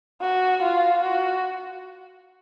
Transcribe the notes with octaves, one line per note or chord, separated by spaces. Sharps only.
F#4
F4
F#4